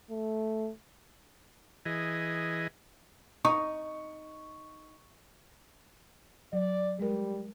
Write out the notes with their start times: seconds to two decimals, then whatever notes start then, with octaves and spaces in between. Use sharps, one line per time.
0.10 A3
1.85 E3 G#4 D#5
3.45 D#4 C#6
6.53 F#3 D5
7.00 G3 G#3 A#4